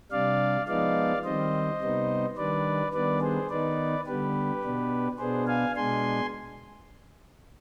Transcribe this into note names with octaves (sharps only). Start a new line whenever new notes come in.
C3 G3 D4 D5 F5
F3 G#3 B3 D#4 D5 F5
D#3 G3 C4 C5 D#5
C3 G3 B3 D#4
D#3 G3 D4 B4 D5
D#3 G3 B3 D4 B4 D5
G#4 C5
D#3 B3 D#4 B4 D5
D3 G3 B3 G4 B4
B2 B3 D4
B2 B3 D4 G#4 C5
F5 G#5
B2 G#3 D4 G#5 C6